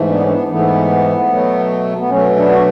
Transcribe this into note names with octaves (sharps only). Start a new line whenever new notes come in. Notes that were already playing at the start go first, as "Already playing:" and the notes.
Already playing: G#2 E3 A3
B3 D4
C#4
B3 D4
G#2 E3 A3 B3
B2 F#3 A3
B3
B2 F#3 A3 C#4
B3 D4
F#4